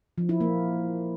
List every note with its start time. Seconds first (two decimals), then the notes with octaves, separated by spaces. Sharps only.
0.18 F3
0.29 E4
0.40 A#3